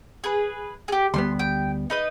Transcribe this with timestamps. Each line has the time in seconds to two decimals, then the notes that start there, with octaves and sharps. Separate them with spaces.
0.24 G#4 B4
0.88 G4 G#4
1.14 D2 G3 B3 C6
1.39 G5
1.90 D#4 B4 D#5